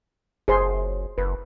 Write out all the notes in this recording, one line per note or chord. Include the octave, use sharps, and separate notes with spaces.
F#1 G#4 C5 C6
F#1 B4